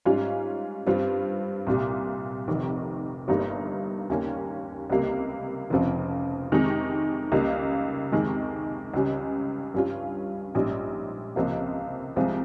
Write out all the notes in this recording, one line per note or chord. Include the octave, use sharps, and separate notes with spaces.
G#2 G3 C#4 F4
G2 G3 C4 F4
C2 A#2 G3
F1 F2 C3 D#3
G1 G2 G3 A#3 D#4
D#2 C#3 G3 A#3 C#4
C#2 C3 G3 A#3
F1 F2 C#3 F3
F2 C3 D#3 G#3 D#4
C#2 C#3 G3 A#3
F2 C3 D#3 G#3
C#2 C#3 G3 C#4
G2 G3 C#4 F4
A#1 G#2 G3 C#4
C#2 C3 F3 A#3
C2 C3 F3 G#3 C4